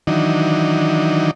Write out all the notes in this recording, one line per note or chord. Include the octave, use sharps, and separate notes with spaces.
D#3 E3 F#3 D4 D#4